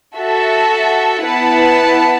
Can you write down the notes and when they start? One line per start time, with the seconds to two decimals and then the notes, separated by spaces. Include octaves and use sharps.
0.16 F#4 A4 E5 A5
1.23 B3 E4 B4 F#5 A5